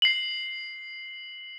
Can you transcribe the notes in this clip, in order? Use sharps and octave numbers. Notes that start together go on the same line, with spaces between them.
C7 F#7